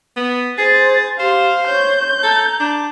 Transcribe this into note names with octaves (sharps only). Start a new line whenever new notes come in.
B3
G#4 C5 A6
G4 C5 F5
C#5 G6
A4 A#5
D4